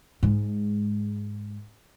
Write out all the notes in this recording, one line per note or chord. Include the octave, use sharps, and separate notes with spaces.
G#2 G#3